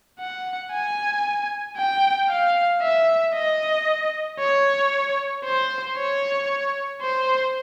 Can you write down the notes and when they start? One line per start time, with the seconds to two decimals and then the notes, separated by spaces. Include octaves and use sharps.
0.19 F#5
0.72 G#5
1.77 G5
2.29 F5
2.82 E5
3.34 D#5
4.39 C#5
5.44 C5
5.96 C#5
7.01 C5